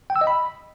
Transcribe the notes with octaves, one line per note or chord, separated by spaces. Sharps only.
G5
E6
D#5
B5